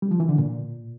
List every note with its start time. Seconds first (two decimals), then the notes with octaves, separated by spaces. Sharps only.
0.02 G3
0.11 F3
0.20 E3
0.29 D3
0.38 A#2